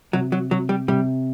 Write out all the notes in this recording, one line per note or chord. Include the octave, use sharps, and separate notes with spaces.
C3 F#3
F#3
C3 F#3
G3
C3 G3